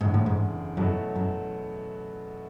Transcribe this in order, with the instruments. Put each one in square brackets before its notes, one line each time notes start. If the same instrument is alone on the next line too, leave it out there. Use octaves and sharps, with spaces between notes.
[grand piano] F#1 E2 D3 [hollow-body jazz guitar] G#2
[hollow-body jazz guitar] A2
G#2
[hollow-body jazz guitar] F#2 [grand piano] B2 F#3 A3 E4
[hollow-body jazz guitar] F#2